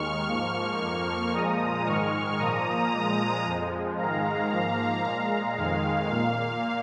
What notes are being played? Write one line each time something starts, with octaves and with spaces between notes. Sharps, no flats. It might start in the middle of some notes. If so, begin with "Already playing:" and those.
Already playing: D#2 D#3 G#3 C#6 F6
G#2 F3 A#3 C#6 F6
F2 F3 A#3
A#2 F3 G#3 A#5 D#6
G#2 D#3 G#3 C#6 F6
A#2 F3 A#3 A#5 D#6
A#2 F3 G#3
F2 F3 G#3
G#2 D#3 G#3 F5 A#5
G#2 F3 A#3
A#2 G#3
F2 D#3 G#3 F5
A#2 A#3 F5